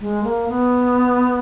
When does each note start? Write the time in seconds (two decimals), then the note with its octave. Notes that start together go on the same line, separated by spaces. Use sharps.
0.01 G#3
0.24 A#3
0.48 B3